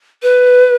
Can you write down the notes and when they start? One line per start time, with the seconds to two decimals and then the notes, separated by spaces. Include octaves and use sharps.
0.23 B4